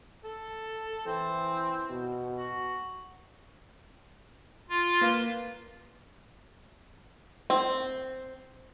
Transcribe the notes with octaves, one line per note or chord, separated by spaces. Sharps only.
A4
E3 C4
B2
F#4
F4
A#3 B4 F5
C4